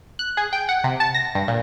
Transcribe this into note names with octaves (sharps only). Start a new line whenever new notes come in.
F#6
G#4
G5
F#5
C3
A5
A#6
G2
A#2